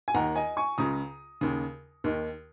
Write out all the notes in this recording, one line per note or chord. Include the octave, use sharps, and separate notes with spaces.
G#5
D#2 D#3 F#5 A#5
D#5 G#5
G#5 C#6
C#2 C#3 A#5 D#6
D#2 C#3
D#2 D#3